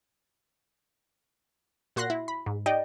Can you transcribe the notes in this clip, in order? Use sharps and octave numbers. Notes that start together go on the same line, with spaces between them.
A#2 F#4 C6 F#6 A#6
E4
B5
G#2
D#4 G4 D5 D#5 G5